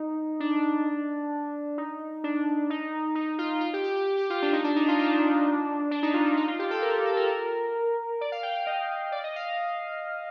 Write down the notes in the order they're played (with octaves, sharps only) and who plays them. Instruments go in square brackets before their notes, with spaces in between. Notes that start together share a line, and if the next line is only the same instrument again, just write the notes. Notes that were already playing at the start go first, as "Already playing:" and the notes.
Already playing: [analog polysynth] D#4
D4
D#4
D4
D#4
D#4
F4
F4
G4
G4
G4
G4
G4
F4
D4
D#4
D4
D#4
F4
D4
D4
D#4
F4
D4
D#4
F4
G4
A4
A#4
A#4
A4
A#4
D5
F5
G5
F5
D#5
D5
D#5
F5